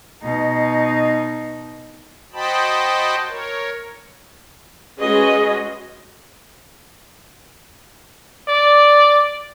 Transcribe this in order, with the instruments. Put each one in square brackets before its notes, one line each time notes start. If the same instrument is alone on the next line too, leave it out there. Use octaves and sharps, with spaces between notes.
[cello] B2 D#4
[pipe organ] F#4 C5 D#5 G5 A5 B5
A#4 C#5
[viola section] G#3 C#4 F#4 G#4 B4 D#5
[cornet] D5